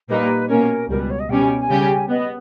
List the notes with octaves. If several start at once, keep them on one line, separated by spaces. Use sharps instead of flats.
A#2 G3 A#3 D#4 B4
B2 A#3 C#4 A#4
C#2 B2 G3 A#4
B4
C#5
D#5
B2 G3 C#4 G5
G#5
G5
G#5
C#3 G3 C#4 G4
B3 D#5